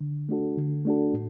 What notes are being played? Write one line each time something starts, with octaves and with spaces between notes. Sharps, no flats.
D3
A3 D4 F#4 A4
D3
A3 D4 F#4 A4
A2